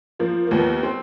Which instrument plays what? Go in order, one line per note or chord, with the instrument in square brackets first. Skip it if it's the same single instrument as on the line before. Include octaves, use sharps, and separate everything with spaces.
[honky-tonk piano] F3 [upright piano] A#3
[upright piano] A#3
[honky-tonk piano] D#2 [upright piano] B3
[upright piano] C4